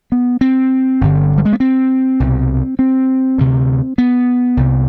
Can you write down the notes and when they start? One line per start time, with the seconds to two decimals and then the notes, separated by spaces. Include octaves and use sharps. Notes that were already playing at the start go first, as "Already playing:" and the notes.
0.12 B3
0.41 C4
1.01 G1 G2 D3
1.37 G3
1.45 G#3
1.53 B3
1.60 C4
2.20 C2 B2
2.79 C4
3.38 D2 C3
3.98 B3
4.57 C2 C3